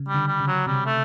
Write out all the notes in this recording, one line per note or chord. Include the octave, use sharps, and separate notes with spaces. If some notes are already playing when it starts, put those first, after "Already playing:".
Already playing: C#3
G3
D3
G3
C#3
F#3
C3 G3
A3